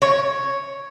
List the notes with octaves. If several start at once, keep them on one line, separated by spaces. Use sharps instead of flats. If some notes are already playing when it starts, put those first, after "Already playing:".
C#5